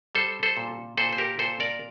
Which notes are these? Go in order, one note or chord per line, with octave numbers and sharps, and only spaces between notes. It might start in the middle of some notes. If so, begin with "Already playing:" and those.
G3 A4 C5
A4 C5
A#2
A#2 A4 C5
C5
G4 A#4
A#2 A4 C5
A#4 D5